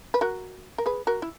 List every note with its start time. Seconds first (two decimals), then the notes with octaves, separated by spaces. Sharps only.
0.14 B4
0.21 F#4 A#4
0.78 A#4
0.86 G#4 B4
1.07 F#4 A#4
1.22 E4